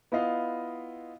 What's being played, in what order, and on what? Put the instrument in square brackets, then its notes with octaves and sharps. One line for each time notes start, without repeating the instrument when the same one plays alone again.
[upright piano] B3 E4 F4 D#5 F5